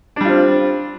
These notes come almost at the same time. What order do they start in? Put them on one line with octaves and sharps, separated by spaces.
D4 G3 F4 C4